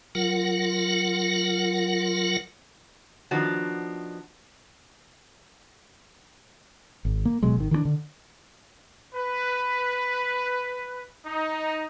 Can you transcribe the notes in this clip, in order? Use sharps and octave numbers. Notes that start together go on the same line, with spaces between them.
F#3 F4 A#4 F#5
D#3 F3 B3 D4 F#4
G#1
A#3
D1 B2 F#3 G#3
G#1 D#3
D#3 E3 G#3 D4
D3
B4
D#4